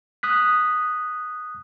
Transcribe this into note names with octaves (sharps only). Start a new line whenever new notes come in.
D#6 F#6 B6